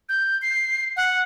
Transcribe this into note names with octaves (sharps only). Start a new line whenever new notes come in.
G6
C7
F#5